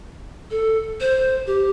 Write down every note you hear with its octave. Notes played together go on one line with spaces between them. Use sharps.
A4
C5
G4